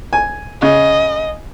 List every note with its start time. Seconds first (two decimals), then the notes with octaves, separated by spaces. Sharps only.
0.13 G#5
0.62 C#3 D#5